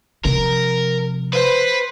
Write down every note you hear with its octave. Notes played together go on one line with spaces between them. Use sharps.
C3 F3 A#4
B4 C5